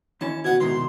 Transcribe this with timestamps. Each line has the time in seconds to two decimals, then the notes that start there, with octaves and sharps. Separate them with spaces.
0.21 D#2 E3 C#4 A5
0.44 B2 F#4 F#5 G#6
0.60 C2 G#2 B2 D#3 C6